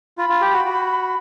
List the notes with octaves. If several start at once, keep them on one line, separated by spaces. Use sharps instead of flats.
F4 B5
F4
G4
F#4
F#4